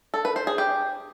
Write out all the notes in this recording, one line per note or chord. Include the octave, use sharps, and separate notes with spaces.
A4
B4
C5
G#4
G4